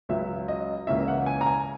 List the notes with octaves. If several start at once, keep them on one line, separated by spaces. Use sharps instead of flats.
C#2 C#3 F#3 E5
D#5
C#2 C#3 E3 A#3 C#4 E5
F#5
G#5
A#5
G#5